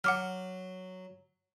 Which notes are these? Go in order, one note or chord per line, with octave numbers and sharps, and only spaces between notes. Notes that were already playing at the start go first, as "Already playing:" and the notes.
F#3 F#5 D6 F6